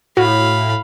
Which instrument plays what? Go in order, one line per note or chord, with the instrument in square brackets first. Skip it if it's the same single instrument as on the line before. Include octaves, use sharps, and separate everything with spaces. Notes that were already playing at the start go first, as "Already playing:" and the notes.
[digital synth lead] A2 [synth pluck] F#4 [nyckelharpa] F5 B5